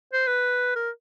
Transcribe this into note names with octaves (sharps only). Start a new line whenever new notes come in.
C5
B4
A#4